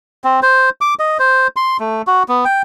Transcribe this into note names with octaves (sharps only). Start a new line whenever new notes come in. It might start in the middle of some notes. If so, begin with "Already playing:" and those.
C4
C5
D6
D#5
C5
C6
A3
F#4
B3
G5